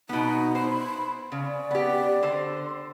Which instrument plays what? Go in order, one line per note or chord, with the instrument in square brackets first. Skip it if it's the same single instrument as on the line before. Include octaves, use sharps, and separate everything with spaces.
[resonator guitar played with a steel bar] B2 B3 [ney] D#4
[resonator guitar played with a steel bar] C5 [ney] B5
[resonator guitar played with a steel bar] C#3 [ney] D5
[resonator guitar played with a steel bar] B3 G4
D3 C5